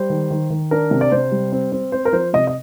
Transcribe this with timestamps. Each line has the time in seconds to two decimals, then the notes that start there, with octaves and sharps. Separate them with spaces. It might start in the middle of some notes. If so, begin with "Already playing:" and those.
Already playing: G3 C5
0.10 D#3
0.31 D#3
0.50 D#3
0.71 D4 A#4
0.91 C3
1.01 D5
1.12 C3 C5
1.32 G3
1.52 C4
1.72 C4
1.92 C4 C5
2.05 A#4
2.13 F3 C5
2.33 C3 D#5
2.47 D#5